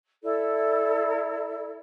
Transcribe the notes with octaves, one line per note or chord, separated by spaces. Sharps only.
E4 A4 D5